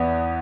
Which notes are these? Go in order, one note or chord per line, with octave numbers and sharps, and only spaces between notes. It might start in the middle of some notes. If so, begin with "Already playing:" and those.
Already playing: E2 B3